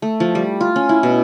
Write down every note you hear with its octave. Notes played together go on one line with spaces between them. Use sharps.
A3
F3
G3
F4
C#4
E4
B2